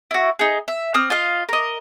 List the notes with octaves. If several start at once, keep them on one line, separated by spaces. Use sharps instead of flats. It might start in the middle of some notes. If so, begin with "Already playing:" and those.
E4 F#4
D#4 G#4
E5
C4 D#6 F6
F4 D#5 F5
A#4 D#5